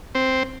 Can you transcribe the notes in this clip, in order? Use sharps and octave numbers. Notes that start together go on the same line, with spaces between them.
C4